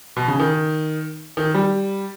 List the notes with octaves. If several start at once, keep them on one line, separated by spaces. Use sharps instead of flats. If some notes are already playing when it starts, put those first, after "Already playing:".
B2
C#3
D#3
D#3
G3